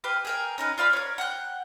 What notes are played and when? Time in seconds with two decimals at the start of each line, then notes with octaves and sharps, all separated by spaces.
0.04 G4 B4 F5
0.25 G#4 A#4 G5
0.58 C#4 D#4 A#4 B4
0.78 F4 D5 F5 B5
0.93 A#4 C#5
1.18 F#5 G5 F#6